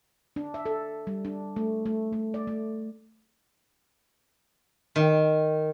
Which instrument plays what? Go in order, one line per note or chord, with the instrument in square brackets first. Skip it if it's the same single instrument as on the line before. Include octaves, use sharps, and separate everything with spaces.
[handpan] D4
E5
A4
G3
D4
A3
A3
A3
D5
A3
[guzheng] D#3